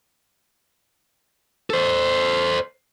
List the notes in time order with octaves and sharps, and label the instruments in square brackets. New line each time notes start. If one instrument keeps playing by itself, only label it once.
[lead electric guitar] A4 C5